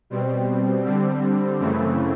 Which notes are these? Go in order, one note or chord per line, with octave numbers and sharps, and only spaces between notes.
B2 G3 C4
D3 G3 C4
F#2 C#3 E3 A3 C4